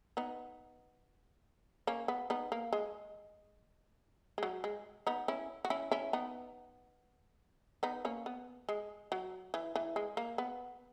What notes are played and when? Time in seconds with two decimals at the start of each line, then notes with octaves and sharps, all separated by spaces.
0.17 B3 D#4
1.87 A#3 C#4
2.08 B3
2.30 B3 D#4
2.52 A#3
2.73 G#3
4.38 G#3
4.43 F#3
4.64 G#3
5.07 B3 D#4
5.28 C#4 E4
5.65 F#4
5.70 C#4 E4
5.92 C#4 E4
6.13 B3 D#4
7.83 B3 D#4
8.05 A#3 C#4
8.26 B3
8.69 G#3
9.12 F#3
9.54 E3
9.76 E3
9.96 G#3
10.17 A#3
10.38 B3